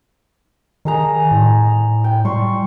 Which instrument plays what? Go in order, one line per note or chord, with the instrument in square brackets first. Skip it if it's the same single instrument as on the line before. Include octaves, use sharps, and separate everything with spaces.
[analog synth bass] D#3 [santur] D#4 G#4 A#5
[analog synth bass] A2
[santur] G5
[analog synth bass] G3 [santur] C6 C#6